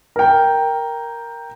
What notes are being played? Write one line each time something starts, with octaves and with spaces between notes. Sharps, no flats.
A#4 G5